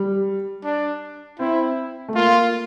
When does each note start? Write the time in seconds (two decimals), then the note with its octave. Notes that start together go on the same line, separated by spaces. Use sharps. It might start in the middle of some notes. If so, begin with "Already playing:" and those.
Already playing: G3
0.64 D4
1.39 C4 E4
2.08 A3
2.15 A#3 F4